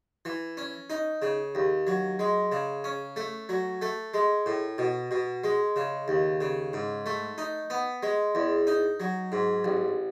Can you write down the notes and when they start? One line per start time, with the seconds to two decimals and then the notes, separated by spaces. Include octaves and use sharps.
0.25 E3
0.57 C#4
0.90 D#4
1.22 C#3
1.55 D#2
1.87 F#3
2.19 G#3
2.52 C#3
2.84 C#4
3.16 A3
3.49 F#3
3.82 A3
4.14 G#3
4.46 A2
4.78 B2
5.11 B2
5.44 G#3
5.76 C#3
6.08 D#2
6.41 C#3
6.73 G#2
7.06 A3
7.38 D#4
7.70 B3
8.03 G#3
8.35 E2
8.67 D#4
9.00 F#3
9.32 G#2
9.64 A1